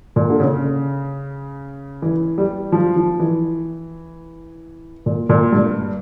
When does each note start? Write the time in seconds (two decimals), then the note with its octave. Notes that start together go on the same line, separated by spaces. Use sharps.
0.16 A#2
0.30 D3
0.40 C#3
2.02 E3
2.38 G3
2.72 F3
2.96 F3
3.20 E3
5.06 A#2
5.29 A#2
5.53 G2